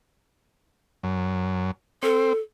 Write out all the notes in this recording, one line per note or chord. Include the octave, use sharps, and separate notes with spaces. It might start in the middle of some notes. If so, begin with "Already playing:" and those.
F#2
C4 A4